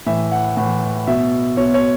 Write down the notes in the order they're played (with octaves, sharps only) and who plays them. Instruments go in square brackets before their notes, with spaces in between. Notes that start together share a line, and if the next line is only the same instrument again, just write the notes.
[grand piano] A2 E3 E5
F#5
A2 E3 F#5
B2 E5
B2 C#5
C#5